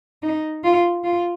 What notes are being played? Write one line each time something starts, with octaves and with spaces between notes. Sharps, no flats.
D#4
F4
F4